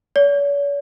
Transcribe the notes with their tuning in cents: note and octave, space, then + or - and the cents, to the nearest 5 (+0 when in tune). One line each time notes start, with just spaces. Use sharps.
C#5 +45